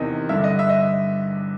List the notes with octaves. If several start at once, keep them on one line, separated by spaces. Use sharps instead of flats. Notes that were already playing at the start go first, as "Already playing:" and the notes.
Already playing: E2 C3 D#3 D#5
G2 D3 E5
D#5
E5
D#5